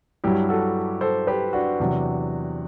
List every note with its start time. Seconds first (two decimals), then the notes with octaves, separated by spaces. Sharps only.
0.24 G2 F#3 E4 G4
0.49 F#4 A4
1.01 A4 C5
1.27 G4 B4
1.53 D4 F#4
1.80 E2 C3 F#3